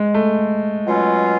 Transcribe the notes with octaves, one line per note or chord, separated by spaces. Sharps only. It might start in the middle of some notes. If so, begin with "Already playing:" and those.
Already playing: G#3
A3
B2 F#3 C#4 F4